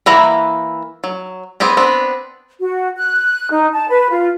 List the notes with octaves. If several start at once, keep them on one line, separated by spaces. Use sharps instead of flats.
E3 A#3 E4 F#5 A#5
F#3
B3 C4 G4 G#4
B3 C4 D4
F#4
F#6
D#4
A5
B4
F4